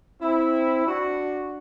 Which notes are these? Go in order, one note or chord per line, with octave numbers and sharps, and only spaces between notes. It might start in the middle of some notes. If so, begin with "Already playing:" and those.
C4 E4
D4 F#4